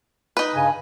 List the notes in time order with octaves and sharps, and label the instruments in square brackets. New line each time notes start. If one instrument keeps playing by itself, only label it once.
[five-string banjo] D#4 B4
[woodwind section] G2 C#3 G#5